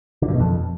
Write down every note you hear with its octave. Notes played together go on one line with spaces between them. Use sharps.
D3
G2
B2
F2